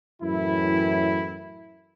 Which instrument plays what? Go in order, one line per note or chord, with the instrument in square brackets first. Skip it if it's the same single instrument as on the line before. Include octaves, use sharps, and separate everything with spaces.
[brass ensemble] F#2 A2 E3 E4